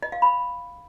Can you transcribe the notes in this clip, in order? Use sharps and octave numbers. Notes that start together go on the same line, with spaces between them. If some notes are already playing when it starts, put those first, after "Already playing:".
D#5
F5
B5